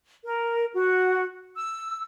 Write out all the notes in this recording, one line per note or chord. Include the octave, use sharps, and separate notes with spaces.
A#4
F#4
E6